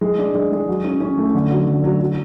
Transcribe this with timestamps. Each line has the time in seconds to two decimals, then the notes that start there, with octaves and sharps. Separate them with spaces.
0.01 G#3
0.19 D4
0.35 G#3
0.52 G#3
0.68 F#3
0.84 C#4
1.00 C#4
1.18 A3
1.35 D3
1.51 F#3
1.67 D3
1.84 F#3
2.00 F#3